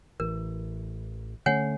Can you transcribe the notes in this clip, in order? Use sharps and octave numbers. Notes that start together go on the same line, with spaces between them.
A1 E3 A#4
D3 A3 C#4 C#5 F#5 G#5